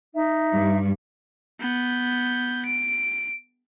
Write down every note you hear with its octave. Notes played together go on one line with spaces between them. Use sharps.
D#4 E5
G2
B3 G6
D7